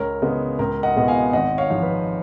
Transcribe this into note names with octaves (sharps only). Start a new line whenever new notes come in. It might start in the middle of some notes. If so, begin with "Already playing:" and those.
Already playing: C#2 A#4 C#5
C#3 G#3 B3
C#2 A#4
D#5 F#5
B2 G#3 B3
F5 G#5
G#1 D#5 F#5
C#5 F5
G#2 F3
B4